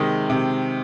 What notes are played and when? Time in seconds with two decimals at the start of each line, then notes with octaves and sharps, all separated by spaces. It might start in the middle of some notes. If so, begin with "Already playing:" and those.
Already playing: C3 D#3 G#3
0.30 C3